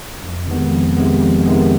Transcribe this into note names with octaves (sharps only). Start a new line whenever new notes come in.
F2
C3 D#3 G#3 B3
F2
C3 D#3 G#3 B3
F2
C3 D#3 G#3 B3